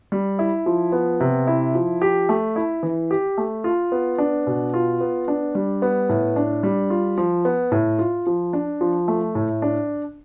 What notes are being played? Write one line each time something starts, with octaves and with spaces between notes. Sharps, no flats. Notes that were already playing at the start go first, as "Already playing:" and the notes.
G3
E4
F3
B3
C3
E4
F3
G4
A3
E4
E3
G4
A3
F4
B3
D4
B2
F4
B3
D4
G3
B3
A2
D4
G3
F4
F3
B3
A2
F4
F3
D4
F3
A3
A2
D4